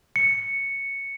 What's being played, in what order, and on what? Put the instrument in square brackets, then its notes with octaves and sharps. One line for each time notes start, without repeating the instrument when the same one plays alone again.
[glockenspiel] C#7